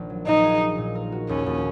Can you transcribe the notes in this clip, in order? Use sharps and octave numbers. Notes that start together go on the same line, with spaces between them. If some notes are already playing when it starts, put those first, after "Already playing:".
Already playing: A#1 D#3
F#3
A#2 D#4
G#4
D#4
A#2
A#4
F#4
D#2 C#4
D#2